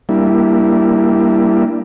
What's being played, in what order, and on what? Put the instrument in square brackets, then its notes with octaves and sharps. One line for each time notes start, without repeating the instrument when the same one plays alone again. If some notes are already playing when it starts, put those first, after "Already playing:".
[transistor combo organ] G3 A#3 D4 E4